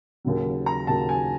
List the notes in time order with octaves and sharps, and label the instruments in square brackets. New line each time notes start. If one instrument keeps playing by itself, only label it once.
[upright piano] D#2 C#3 F#3
A#5
D#2 C#3 F#3 A5
G#5